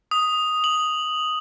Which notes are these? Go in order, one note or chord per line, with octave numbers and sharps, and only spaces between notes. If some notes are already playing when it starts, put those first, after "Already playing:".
D#6
F#7